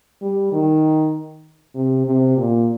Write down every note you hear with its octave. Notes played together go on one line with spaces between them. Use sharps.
G3
D#3
C3
C3
A#2